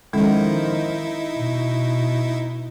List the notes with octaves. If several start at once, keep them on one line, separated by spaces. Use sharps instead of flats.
D#3 F3 G#3 C#4 D#4 E4 A4
B2